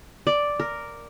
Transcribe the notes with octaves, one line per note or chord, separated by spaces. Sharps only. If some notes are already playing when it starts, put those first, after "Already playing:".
D5
A#4